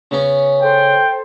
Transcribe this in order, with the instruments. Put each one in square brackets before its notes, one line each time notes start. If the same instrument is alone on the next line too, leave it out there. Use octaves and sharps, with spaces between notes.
[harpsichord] C#3 B3 C#4
[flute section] A4 C5 [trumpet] G5